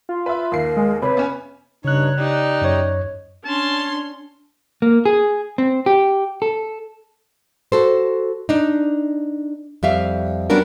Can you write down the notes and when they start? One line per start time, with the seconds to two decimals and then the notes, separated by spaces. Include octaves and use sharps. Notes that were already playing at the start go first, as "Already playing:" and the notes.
0.09 F4
0.26 B4 E5
0.52 D#2 A#4 C7
0.77 G#3
1.02 C3 B4 C#5
1.17 B3 C#4 G#5
1.85 G2 C#3 D#4 C#5 F#6
2.19 D#4 G4 D5
2.61 F#2 C#5
3.45 C#4 D4 A5 C6
4.82 A#3
5.05 G#4
5.58 C4
5.86 G4
6.42 A4
7.72 F#4 A4 C5
8.49 D4 D#4
9.83 F2 G3 E5 F5
10.50 G3 B3 C#4 D4 F#4 A#4